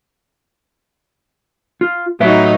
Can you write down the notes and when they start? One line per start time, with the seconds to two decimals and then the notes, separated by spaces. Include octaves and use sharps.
1.81 F4
2.20 A2 F#3 D#4 B4 E5